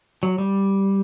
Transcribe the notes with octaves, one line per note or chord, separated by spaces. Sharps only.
F#3
G3